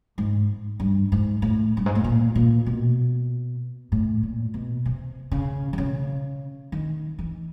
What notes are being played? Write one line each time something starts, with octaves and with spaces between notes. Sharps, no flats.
G#2
G2
G#2
A2
G2
G#2
A2
A#2
A#2
B2
A2
A#2
B2
C3
C#3
D3
C#3
D#3
E3